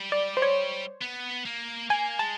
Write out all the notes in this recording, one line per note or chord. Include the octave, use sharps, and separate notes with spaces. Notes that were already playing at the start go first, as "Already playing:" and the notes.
Already playing: G3
D5
C5
C#5
B3
A#3
A#3 G#5
G#3 A5